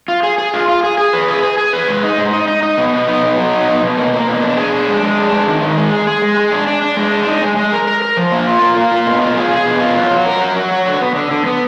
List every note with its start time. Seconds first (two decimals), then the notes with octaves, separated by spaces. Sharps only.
0.08 F4
0.23 G#4
0.38 G#4
0.54 F4
0.68 F4
0.83 G#4
0.98 G#4
1.13 B4
1.28 G#4
1.43 G#4
1.58 G#4
1.73 B4
1.88 G#3
2.03 D#4
2.18 G#2
2.33 D#4
2.48 D#4
2.63 D#4
2.78 B2
2.93 B3
3.08 D#4
3.23 B2
3.37 F#3
3.53 D#4
3.68 B2
3.83 B2
3.97 A#3
4.13 A#3
4.27 B2
4.42 D4
4.57 G#4
4.73 D4
4.88 G#3
5.02 G#3
5.17 D4
5.32 G#3
5.48 D#3
5.62 D#3
5.78 G#3
5.92 G#4
6.07 G#4
6.22 G#3
6.37 G#4
6.52 D4
6.67 D4
6.82 D4
6.97 G#3
7.12 D4
7.27 D#4
7.42 G#3
7.57 G#3
7.72 A#4
7.87 A#4
8.02 A#4
8.17 F3
8.32 A#3
8.47 F4
8.62 A#3
8.77 A#3
8.92 F4
9.07 B2
9.22 F4
9.37 G#4
9.51 G#4
9.66 B2
9.81 F4
9.96 F#3
10.11 F#3
10.26 A#4
10.41 F#4
10.56 F#3
10.71 F#4
10.86 D3
11.02 B3
11.16 D3
11.31 D3
11.46 B3